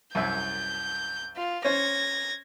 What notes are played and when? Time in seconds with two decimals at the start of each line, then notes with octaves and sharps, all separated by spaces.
0.15 C2 F#2 E5 G6
1.36 F4
1.65 C#4 C5 C#5 G#6 A#6